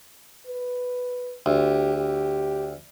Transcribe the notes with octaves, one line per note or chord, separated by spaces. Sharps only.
B4
D2 G4
G4